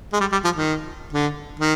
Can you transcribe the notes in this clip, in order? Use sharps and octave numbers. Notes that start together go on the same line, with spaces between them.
G#3
G3
G3
F3
D#3
D3
D#3